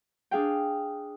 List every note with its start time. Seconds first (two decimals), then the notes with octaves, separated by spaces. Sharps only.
0.31 D4 G#4 F5 G5